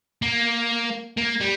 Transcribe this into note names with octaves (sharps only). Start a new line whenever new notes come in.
A#3
A#3
G3